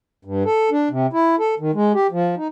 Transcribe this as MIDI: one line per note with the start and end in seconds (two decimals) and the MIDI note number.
0.25 0.43 43
0.45 0.70 69
0.71 0.89 62
0.91 1.07 48
1.13 1.36 64
1.39 1.55 69
1.60 1.71 51
1.74 1.92 56
1.95 2.07 67
2.12 2.35 53
2.37 2.48 63